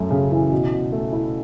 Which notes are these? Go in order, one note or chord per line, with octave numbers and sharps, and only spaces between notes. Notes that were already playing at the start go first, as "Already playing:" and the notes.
Already playing: F#2 A3
C#3
E3
B2
B2
A3
E4